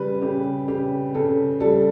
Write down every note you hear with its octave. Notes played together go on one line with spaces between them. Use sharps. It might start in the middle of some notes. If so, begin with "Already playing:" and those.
Already playing: C#3 G3 B4
C#3 G4
C#3 G4
C#3 A4
G3 A4